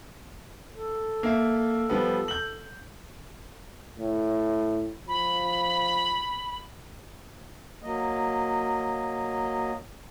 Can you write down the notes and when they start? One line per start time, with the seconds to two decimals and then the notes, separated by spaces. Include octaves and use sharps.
0.74 A4
1.23 A#3 E5
1.90 F3 G3 B3
2.28 G6 F#7
3.98 A2
5.08 F3 B5
7.82 F#3 A#3 D#5